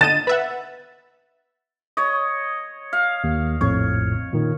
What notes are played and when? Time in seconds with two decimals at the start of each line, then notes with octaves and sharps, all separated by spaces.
0.01 D3 D#5 A6 D#7 E7
0.27 B4 E5 F#5
1.97 C#5 D#5
2.93 F5
3.24 D#2
3.61 A#1 F2 A2 C#5
4.33 A#2 D#3